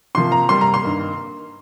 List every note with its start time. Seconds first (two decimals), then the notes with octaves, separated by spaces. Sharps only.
0.15 C3 F3 A#3 C6
0.32 A#5
0.49 C3 G3 A#3 C6
0.61 A#5
0.74 C6
0.82 G2 D#3 A#3